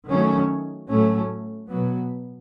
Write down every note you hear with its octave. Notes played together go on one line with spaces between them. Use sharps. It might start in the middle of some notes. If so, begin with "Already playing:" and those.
D#3 F#3 A3 C#4
A2 F#3 A3 C#4
B2 F#3 B3